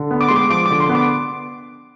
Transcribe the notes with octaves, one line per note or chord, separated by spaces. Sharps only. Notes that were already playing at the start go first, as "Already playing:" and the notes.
Already playing: D3
B3
D6
G#3 C6
D6
F3 D6
D3 D6
C6
B3
D6